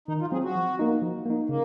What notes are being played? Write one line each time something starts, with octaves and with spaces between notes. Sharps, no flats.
D#3 D#4
F4
F#3 C4 G#4
F#4
F3
A#3 D#4
F3
A#3 D#4
C#3 A#3